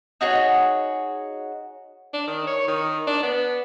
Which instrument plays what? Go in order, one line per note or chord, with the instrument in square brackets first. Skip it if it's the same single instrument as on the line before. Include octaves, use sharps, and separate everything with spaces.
[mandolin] D#4 F#4 G#4 C#5
[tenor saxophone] D4
D#3
C#5
D#3
D4
B3